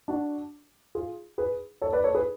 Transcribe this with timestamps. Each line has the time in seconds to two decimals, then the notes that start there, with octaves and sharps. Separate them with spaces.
0.08 D4 F#4
0.95 F4 G#4
1.38 G#4 B4
1.81 A4 C#5
1.93 B4 D5
2.04 A4 C#5
2.15 G#4 B4